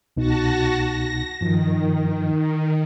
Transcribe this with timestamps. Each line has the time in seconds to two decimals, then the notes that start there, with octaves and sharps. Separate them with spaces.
0.17 C2 B2 D#4 F#4 A5 A#6
0.87 A#6
1.41 G2 D#3 F3